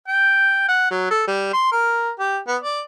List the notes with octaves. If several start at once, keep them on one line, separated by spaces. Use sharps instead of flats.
G5
F#5
F#3
A4
G3
C6
A#4
G4
B3
D5